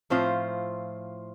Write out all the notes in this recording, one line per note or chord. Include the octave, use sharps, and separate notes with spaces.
A2 F3 C4 F4 C5